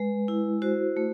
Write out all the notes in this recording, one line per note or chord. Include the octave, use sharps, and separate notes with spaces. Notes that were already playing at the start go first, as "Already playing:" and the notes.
Already playing: G#3 B4
E4
F#4 C5
A3